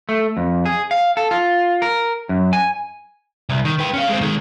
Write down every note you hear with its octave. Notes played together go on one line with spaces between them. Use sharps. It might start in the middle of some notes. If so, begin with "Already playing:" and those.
A3
F2
G#4
F5
A4
F4
A#4
F#2
G#5
C2
D#3
B4 G5
C#4 F5
G#3 C4
D#3 G#3